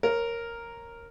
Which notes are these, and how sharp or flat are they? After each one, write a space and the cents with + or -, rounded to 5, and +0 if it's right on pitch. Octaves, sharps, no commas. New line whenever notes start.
A#4 +0 C#5 -20